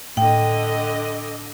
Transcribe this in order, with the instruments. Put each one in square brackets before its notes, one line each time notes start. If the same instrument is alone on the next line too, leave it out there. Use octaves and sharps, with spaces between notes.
[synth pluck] A2 [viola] D3 D#5 [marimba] G5